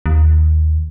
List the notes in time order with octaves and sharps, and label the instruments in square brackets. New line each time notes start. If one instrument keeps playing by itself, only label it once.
[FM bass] D#2